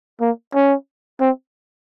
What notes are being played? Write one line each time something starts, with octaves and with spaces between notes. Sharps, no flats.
A#3
C#4
C4